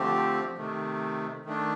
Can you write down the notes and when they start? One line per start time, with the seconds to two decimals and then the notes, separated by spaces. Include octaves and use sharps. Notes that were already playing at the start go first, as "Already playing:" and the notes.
Already playing: D3 F3 A3 C4 G4
0.58 C3 D#3 A3
1.45 D#3 A3 D4